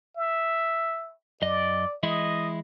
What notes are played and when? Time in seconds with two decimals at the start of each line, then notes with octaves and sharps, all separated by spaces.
0.17 E5
1.42 F#2 D5 D#5
2.03 E3 G#3 E4 D#5